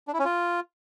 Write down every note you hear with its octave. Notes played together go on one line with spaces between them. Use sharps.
D4
E4
C#4
F4